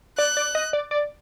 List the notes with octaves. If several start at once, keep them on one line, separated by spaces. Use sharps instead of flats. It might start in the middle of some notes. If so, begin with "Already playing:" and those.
D5 F#6
D5
D#5
D5
D5